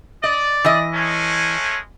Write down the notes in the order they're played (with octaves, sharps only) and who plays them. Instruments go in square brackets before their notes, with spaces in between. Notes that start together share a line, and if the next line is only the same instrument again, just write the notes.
[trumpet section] D5 [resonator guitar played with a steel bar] D#5
[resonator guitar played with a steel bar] E3 D#5
[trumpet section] G#3 A3 C#4